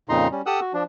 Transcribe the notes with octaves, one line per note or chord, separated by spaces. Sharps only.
F2 A#2 C#3 D#4 A#5 C6
G3 C#4
G4 A4 F#5 D#6 E6 F#6
F#4
F3 D4